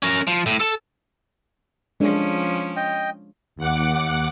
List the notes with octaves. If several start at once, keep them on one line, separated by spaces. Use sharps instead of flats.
C#4 A#4
F3
A2
A4 A5
F3 G#3 C#4 D4
D#5 G5
D#2 F#5 D6